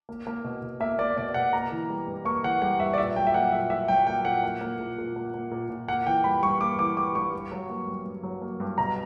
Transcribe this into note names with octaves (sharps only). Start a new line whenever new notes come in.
A#3
A#3
B2
B2
A#3 E5
A#3 D5
B2 D5
B2 F#5
A#3 A#5
E3
G3
G2
A#3 C#6
E3 F#5
G3 F#5
G2 E5
D5
A#2 E5
F#3 G5
E5
A#3 F#5
A#2 E5
A#2 E5
F#3 G5
A#3 G5
A#2 F#5
A#3
A#3
A#2
A#2
A#3
A#3
A#2
A#2
A#3 F#5
E3 G5
G3 B5
G2 C#6
A#3 D6
E3 D6
G3 D6
G2 C#6
G2
F#3
A#3
G2
G2
F#3
A#3
G2
B2 A#5